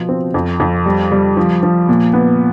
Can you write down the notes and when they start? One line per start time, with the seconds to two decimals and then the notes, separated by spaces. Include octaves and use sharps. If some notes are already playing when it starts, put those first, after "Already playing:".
Already playing: B2 F3
0.09 C4
0.34 F2
0.60 F2
0.86 G3
1.12 G3
1.37 F3
1.63 F3
1.89 A#2
2.14 B3